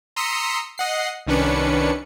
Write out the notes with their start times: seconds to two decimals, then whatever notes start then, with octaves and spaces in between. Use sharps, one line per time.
0.16 A#5 C6 D#6 E6 B6 C#7
0.78 D#5 F#5 C7
1.27 C2 D#3 C#4 D4 B4 C#7